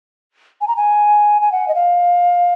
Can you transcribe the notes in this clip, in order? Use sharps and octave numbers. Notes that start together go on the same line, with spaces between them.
G#5
A#5
G#5
G#5
F#5
D#5
F5